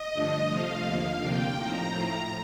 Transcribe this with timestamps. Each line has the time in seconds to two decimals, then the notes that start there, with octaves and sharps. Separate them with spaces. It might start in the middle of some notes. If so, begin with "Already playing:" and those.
Already playing: D#5
0.12 G2 D3 F3 A3 D4
0.47 C3 F3 A3 F5
0.84 D#2 D3 F3 A#3
1.19 C3 F3 A#3 D4 G5
1.55 A2 F3 C4 D#4 A#5
1.90 A2 F3 A3